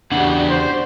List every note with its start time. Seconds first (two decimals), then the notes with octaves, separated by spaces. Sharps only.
0.11 E2 C#3 D4 F#4 G4 D5 F#5
0.49 C5